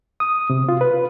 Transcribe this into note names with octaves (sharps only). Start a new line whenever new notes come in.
D#6
C3
F4
B4